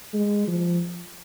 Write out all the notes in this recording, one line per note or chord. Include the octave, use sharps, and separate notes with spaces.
G#3
F3